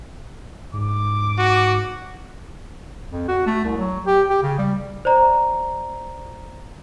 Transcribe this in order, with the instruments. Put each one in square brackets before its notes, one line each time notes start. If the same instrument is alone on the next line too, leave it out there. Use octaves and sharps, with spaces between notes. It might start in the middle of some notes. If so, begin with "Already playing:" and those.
[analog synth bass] G#2 [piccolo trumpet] D6
[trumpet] F#4
[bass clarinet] F2
F#4
A3
C2
F#3
G4
G4
C#3
G3
[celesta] C5 D5 A#5